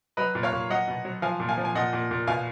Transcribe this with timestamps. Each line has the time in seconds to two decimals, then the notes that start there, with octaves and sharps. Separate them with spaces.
0.17 F#3 B4 D#5
0.35 A#2
0.43 C#5 F5
0.53 A#2
0.70 F#3 D#5 F#5
0.88 B2
1.05 F#3
1.22 F3 F5 G#5
1.40 A#2
1.49 F5 G#5
1.57 F3
1.65 G#5
1.75 A#2 D#5 F#5
1.93 A#2
2.11 A#2
2.27 B2 F5 G#5